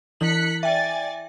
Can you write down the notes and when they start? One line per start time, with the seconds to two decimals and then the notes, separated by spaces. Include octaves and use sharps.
0.21 E3 E4 F#6 B6 C#7 F#7
0.63 D5 E5 G5 G#5 A6